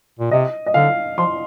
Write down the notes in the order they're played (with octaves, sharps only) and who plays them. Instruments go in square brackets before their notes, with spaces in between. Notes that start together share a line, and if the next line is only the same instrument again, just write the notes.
[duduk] A#2
[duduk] C3 [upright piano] D#5
[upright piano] D#5
[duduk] D3 [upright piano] F5
[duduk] F3 [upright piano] C6